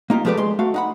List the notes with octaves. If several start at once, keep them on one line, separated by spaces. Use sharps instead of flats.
A#3 D#4 F4 G4
F3 G#3 A3 G4 B4 D5
G#3 C6
A3 F#4 F5
D#4 F#5 B5